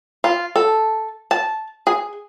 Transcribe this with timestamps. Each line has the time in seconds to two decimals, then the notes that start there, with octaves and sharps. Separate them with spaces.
0.24 F4
0.56 A4
1.31 A5
1.87 G#4